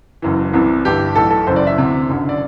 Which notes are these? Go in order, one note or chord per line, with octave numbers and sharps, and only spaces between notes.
F#1 F#2 E3
C2 C3 E3
G1 G2 E3 G4
B1 A2 E3 A4
A4
F#1 F#2 E3 C5
D5
E5
D2 C3 E3
F#1 F#2 D3
D5